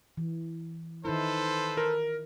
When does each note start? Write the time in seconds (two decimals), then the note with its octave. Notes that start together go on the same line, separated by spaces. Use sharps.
0.17 E3
1.05 D#3 D#4 E4 A4 B4 C5
1.77 A#4